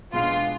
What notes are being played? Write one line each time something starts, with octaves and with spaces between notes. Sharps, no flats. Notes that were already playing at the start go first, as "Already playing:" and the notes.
B2 G#3 B3 D4 F4